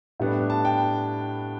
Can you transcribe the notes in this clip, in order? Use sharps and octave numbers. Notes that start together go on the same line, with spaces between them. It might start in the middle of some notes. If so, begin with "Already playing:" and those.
A2 G3 B3 D4
A5
G5